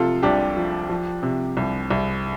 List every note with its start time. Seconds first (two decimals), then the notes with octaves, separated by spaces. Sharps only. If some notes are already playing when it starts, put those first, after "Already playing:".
Already playing: C3 F3 F4 A4
0.23 C2 D4 G4
0.57 F3
0.89 F3
1.23 C3
1.57 C2
1.90 C2